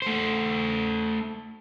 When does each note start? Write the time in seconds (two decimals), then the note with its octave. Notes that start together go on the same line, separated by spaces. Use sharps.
0.02 A3 C5